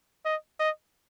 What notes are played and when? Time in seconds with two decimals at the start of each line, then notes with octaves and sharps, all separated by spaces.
0.25 D#5
0.60 D#5